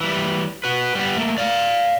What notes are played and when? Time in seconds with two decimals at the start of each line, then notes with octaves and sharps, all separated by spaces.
0.01 E3 G3
0.64 F#4 B4
0.95 G3 B3
1.17 A3 A#3
1.38 D5 F5